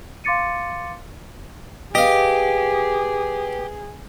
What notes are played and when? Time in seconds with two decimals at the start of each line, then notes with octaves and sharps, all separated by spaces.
0.24 F5 C6 D6 A6 C#7 D#7
1.95 G4 G#4 B4 D#5 F5